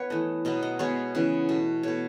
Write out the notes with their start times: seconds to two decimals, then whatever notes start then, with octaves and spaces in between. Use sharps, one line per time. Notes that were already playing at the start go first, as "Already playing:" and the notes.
Already playing: B3 B4 C#5
0.10 E3 A3 D#5
0.45 B2 F#3 B3 D#5
0.63 D#5
0.79 B2 G#3 B3 C#5
1.15 C#3 E3 B3
1.49 B2 A3
1.83 B2 A3 C#5